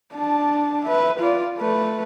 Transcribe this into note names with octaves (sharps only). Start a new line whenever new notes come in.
D4 A5
B4 E5
F4 D5
A3 B4